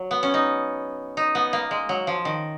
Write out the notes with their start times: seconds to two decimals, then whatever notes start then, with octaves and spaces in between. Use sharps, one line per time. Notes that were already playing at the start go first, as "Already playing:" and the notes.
Already playing: F#3
0.11 B3
0.23 C#4
0.34 D#4
1.17 D#4
1.35 B3
1.53 A#3
1.71 G#3
1.89 F#3
2.07 F3
2.25 D#3